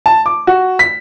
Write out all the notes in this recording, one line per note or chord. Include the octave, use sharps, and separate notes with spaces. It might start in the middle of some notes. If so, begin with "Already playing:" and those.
A5
D6
F#4
B6